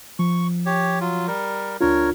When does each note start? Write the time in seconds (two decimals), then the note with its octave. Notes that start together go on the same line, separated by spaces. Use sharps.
0.19 F3 C#6
0.66 G4 C#5
1.01 F#3 F4
1.27 G3 A#4
1.81 C#2 D4 F4 A#4 C#5